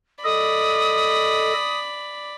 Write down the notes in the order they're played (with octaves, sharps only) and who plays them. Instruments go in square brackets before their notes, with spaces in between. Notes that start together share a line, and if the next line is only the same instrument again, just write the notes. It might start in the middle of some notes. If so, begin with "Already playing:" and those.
[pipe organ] A4 D#5 [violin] D5 B5 [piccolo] D#6